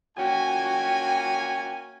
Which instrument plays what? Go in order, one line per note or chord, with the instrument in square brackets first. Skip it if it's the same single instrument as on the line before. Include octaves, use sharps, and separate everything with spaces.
[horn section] A#3 C#4 G#5 [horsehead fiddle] F#4 G5